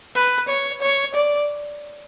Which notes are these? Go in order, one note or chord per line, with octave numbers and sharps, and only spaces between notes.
B4
C#5
C#5
D5